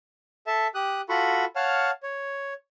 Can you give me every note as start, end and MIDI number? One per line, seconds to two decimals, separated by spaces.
0.47 0.67 69
0.47 0.67 76
0.47 0.67 81
0.75 1.01 67
0.75 1.01 87
0.75 1.01 90
1.09 1.45 65
1.09 1.45 66
1.09 1.45 69
1.09 1.45 78
1.09 1.45 83
1.09 1.45 85
1.56 1.91 73
1.56 1.91 77
1.56 1.91 78
1.56 1.91 81
1.56 1.91 89
2.03 2.54 73